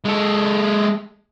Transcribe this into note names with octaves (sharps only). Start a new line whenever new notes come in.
G#3 A4